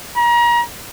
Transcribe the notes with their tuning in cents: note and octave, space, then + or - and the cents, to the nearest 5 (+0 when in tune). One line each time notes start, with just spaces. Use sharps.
A#5 +35